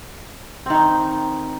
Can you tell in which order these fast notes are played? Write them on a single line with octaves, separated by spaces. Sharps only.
C4 D#3 D#4